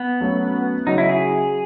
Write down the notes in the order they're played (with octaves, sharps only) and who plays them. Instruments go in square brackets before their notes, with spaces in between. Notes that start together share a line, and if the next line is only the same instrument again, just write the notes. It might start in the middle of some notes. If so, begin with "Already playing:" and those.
Already playing: [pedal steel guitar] B3
[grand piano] F#3 A3 C#4 F#4
[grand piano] C#3 F#3 C#4 F#4 [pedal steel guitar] D#4
[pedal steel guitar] E4
G#4